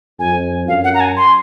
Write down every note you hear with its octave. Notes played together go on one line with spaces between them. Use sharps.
F2 G#5
F#2 F5
F#5
A#5
G#5
C6